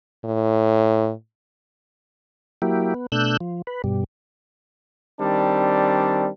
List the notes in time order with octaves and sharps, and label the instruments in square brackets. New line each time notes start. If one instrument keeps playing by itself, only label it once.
[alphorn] A2
[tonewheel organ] F#3 A#3 E4 G4
B3
B2 A3 D4 E6 F#6 G6
F3
B4
G2 B2 G3
[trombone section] D#3 G3 C4 D4